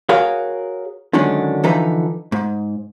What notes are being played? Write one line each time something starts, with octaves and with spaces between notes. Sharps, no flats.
F#4 G#4 A#4 C#5 F5
D3 D#3 F#3 G#3 C#4 D4
D3 E3 F3 D#4 B4 A#5
G#2